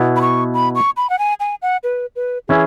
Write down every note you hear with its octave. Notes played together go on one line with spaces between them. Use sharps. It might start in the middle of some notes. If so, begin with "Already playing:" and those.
Already playing: B2 B3 E4
B5
C#6
B5
C#6
B5
F#5
G#5
G#5
F#5
B4
B4
E3 C#4 E4 G#4